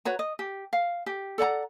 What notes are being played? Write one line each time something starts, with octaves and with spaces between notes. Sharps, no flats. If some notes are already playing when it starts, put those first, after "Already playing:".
F#4 B4 C#5 A#5
D#5
G4
F5
G4
A4 D5 F#5 A#5